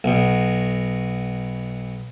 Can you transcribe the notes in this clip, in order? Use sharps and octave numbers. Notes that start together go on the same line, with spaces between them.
B1 B2